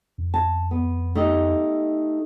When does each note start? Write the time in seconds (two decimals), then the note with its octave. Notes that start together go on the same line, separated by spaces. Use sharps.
0.18 F2
0.34 A5
0.71 B3
1.15 A3 D#4 G4